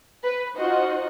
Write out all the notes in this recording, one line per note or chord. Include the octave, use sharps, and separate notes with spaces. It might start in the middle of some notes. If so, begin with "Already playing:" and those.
B4
D#4 F4 F#4 C5 D#5 F#5